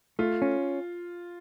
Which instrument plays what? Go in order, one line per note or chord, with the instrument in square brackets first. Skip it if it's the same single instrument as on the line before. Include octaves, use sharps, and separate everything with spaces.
[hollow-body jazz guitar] A3 [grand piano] F4
[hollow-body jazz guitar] C#4